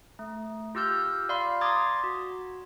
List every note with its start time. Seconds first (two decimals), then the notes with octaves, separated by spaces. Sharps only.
0.19 A3
0.75 F4 G4 E6 F6 G6
1.29 D5 F5 B5 C6
1.61 A#5 C6 D6 D#6 G#6 A6
2.04 F#4